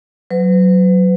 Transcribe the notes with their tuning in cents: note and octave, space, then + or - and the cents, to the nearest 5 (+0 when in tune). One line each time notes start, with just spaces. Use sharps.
F#3 +0 B4 +40